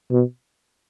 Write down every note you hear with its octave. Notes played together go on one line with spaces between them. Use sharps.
B2